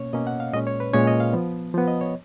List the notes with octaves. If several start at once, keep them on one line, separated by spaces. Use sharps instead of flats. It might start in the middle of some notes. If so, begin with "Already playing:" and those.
Already playing: B2 A#3 C#4 C#5
B2 A#3 C#4 D#5
F#5
F5
A#2 G#3 C#4 D#5
C#5
B4
A#2 G#3 C#4 C#5
D#5
F5
F3 B3
F3 B3
D#5
C#5